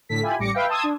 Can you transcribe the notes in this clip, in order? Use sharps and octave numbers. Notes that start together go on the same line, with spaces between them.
A2 D3 A4 B6
E4 F4 G4 G#5 B5
A1 G3 D6 A#6 C#7
B4 E5 F5 G5
A5 C6 D#6 E6 G#6
D4